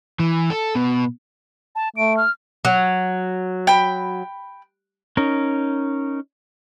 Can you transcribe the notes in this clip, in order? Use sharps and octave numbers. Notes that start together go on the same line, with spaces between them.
E3
A4
B2
A5
A3 D7
F6
F#3
G5 B5
C#4 D#4 A#4